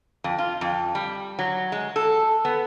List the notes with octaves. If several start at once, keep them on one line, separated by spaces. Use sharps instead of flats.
F2
F4
F2
G3
F#3
G#3
A4
B3